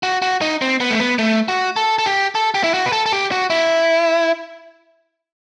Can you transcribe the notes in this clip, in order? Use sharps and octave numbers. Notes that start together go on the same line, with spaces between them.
F#4
F#4
D#4
C4
B3
A3
B3
A3
F#4
A4
A4
G4
A4
G4
E4
F#4
B4
A4
A4
G4
F#4
E4